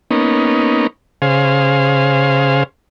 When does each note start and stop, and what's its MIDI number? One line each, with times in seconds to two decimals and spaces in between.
0.11 0.87 58
0.11 0.87 59
0.11 0.87 61
0.11 0.87 63
1.22 2.63 49
1.22 2.63 68
1.22 2.63 72
1.22 2.63 77